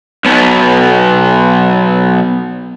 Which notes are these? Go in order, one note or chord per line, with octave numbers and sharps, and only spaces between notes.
B1 B2